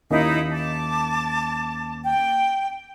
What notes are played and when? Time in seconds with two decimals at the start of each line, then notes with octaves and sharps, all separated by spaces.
0.11 D#2 A#3 C#4 D#4 E4
0.53 A5 D6
2.05 G5